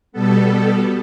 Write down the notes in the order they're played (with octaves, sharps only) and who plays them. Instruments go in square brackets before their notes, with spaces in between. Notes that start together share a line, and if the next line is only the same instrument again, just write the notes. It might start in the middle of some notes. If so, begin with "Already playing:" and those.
[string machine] B2 G3 B3 A4